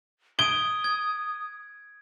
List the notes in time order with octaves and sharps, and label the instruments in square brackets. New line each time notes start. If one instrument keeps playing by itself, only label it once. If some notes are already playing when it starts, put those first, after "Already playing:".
[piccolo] D#6 [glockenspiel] G#6 D7 D#7 [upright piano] G7
[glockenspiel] G#6